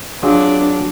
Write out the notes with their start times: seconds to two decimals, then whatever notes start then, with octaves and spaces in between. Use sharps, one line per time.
0.23 F#3 D4 F4 G#4